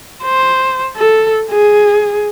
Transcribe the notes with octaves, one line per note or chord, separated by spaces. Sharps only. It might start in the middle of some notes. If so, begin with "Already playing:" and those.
C5
A4
G#4